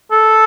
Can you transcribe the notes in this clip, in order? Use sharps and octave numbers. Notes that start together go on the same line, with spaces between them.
A4